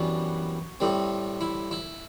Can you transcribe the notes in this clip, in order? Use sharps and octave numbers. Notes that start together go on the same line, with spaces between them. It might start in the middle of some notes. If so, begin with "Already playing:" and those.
Already playing: F#2 E3 G3 B3 D4 F#4
A2 G3 C4
E4
E4